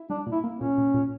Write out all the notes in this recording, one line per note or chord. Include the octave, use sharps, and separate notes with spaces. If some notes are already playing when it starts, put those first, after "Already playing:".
Already playing: E4
G3 D4
A#2
E4
A#3
C#4
A#2
A#2
A#2